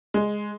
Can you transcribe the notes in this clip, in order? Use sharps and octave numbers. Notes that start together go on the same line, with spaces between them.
G#3